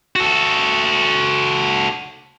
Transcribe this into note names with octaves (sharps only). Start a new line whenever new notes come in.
F#4 A4